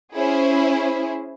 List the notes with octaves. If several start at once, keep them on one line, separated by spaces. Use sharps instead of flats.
C#4 E4 G#4 C5